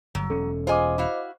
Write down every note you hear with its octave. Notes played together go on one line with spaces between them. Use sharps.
G1 F#3
E1 C#4 A4
F4 G#4 C5 D#5 G#5 D6
E4 F#4 F5